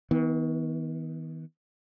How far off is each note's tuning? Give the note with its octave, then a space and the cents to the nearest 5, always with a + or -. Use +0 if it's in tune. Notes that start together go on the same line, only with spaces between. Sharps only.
D#3 +45 B3 +0